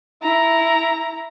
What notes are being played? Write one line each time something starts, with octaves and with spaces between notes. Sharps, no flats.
E4 A#5